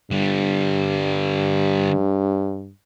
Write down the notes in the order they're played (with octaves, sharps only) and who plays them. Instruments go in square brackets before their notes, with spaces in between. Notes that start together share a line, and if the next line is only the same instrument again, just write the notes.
[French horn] G2 [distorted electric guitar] D3 G3